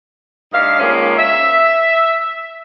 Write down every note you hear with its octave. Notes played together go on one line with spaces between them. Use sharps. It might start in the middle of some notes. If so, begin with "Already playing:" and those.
G2 A3 D#4 F5
D#3 F3 G#3 A#3 C#4
E5